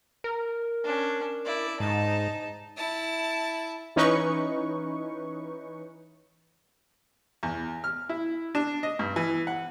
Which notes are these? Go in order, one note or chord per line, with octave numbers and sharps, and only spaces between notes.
A#4
C#4 D4
E4 D5
G#2 D#4 A5
E4 A5
E3 C#4 D#4 B4 C#6
E2
F6
E4
D4
D#5
G2
E3
F#5